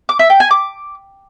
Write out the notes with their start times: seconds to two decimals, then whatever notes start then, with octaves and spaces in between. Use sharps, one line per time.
0.09 D6
0.19 E5
0.30 G5
0.40 G#5
0.51 D6